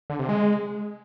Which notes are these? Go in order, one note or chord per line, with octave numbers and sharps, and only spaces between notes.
D3
C3
G#3